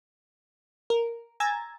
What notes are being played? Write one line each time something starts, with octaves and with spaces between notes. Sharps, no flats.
A#4
G#5 A#5 E6 G#6 A6